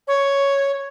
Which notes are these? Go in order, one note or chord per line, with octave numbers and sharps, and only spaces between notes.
C#5